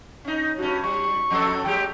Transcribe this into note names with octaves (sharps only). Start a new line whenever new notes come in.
C#4 D#4
G2 C#4 F#4
G3 C#6
F2 F#3 A4
F#3 G#3 G4 G5